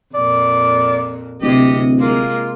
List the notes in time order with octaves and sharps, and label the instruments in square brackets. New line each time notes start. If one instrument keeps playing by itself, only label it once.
[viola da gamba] F2 A#2 [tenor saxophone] D5
[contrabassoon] D1 [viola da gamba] C3 D#5 [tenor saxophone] G4
[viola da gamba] G#3 A#3 [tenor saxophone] F4